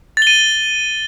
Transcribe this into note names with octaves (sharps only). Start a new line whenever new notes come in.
A6 D#7 G7